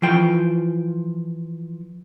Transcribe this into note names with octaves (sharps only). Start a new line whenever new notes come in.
E3 F3 G5